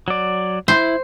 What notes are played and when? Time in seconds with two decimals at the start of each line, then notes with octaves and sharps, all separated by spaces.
0.08 F#3 D5
0.68 E4 C5